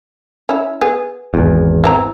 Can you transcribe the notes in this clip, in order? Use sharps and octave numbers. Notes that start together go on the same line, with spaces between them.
C#4 E4
B3 G#4
G#1 E2
E3 C4 A#5